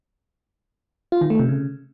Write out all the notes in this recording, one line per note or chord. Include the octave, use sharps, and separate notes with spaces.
F4
D#3
A3
C3
C#3